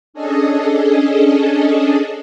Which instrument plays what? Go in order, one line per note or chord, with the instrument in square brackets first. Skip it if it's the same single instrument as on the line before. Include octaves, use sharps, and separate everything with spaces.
[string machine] C#4 D4 G#4 A4 D#5